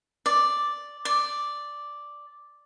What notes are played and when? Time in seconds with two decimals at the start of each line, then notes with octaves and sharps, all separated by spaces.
0.26 D5
1.05 D5